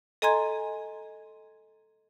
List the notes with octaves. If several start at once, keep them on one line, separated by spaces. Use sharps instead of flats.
A4 D#5 G#5 A#5 C6 G#6